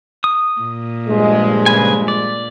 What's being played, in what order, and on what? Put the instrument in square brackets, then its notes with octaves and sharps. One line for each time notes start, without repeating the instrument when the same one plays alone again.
[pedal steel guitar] D#6
[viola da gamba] A#2
[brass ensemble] G2 F3 G#3
[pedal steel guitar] C#3 B4 G#5
D5